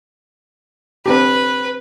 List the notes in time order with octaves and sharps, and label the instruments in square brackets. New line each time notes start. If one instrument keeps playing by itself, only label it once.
[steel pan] C4 D4 G4 [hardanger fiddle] B4